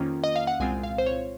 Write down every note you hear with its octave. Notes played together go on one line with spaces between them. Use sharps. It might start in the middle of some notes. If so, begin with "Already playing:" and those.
Already playing: F2 D#3 A#3 C#4 F4
D#5
F5
F#5
C2 A#2 G#3 C4 F4 G#5
F5
C5
C#5